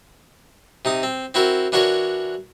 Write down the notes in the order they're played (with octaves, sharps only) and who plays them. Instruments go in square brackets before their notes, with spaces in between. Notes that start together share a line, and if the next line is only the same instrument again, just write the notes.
[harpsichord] C3 D#4 D#6
C4
C4 E4 F#4 A#4
E3 D4 F#4 A#4 C#5